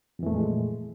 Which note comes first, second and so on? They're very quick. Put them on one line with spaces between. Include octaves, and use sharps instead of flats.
F2 E3 A3 A#2 G#3